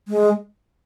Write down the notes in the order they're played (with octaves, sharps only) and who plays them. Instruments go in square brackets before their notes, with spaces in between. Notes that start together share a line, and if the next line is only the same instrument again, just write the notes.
[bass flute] G#3